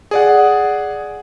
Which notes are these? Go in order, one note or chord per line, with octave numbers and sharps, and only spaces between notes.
G#4 D5 F#5